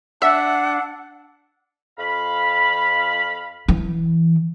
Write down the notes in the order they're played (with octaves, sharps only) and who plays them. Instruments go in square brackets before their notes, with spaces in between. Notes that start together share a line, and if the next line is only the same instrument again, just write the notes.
[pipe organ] D4 [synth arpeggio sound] E5 [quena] F#5 [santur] E6
[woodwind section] F2 F5 B5
[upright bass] E3